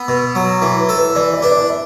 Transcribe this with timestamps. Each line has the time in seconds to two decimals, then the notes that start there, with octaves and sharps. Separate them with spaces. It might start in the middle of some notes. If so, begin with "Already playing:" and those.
Already playing: B3 E6
0.08 B2
0.35 F#3
0.62 E3 D6
0.81 B4
0.89 A4
0.98 B4
1.16 E3 D5
1.34 D5
1.42 D4 B4
1.51 D5
1.70 E5